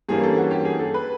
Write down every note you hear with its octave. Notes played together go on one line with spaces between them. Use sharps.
G2 E3 G3 A#3 C#4 G#4
A4
F#4
G4
G#4
A4
B4